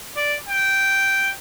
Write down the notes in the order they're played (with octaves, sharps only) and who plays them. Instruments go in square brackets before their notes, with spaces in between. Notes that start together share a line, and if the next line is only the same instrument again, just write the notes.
[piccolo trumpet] D5
G5